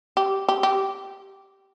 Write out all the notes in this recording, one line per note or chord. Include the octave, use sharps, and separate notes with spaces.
G4
G4
G4